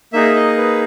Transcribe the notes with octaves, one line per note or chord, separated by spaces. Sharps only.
A#3 D#4 G#4 E5
D#5
B4